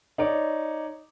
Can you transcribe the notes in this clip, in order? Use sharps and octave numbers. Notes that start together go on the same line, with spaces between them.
D#4 C#5 D5